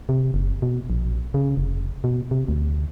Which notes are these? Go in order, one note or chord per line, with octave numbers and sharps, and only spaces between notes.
C3
F#1
B2
A#1
C#3
F1
B2
C3
D2